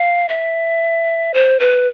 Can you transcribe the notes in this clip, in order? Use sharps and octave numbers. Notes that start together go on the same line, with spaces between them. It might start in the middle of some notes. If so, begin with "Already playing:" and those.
Already playing: F5
E5
C5
B4